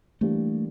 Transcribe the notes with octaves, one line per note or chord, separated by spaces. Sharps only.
E3 G3 A3 A#3 D4 G4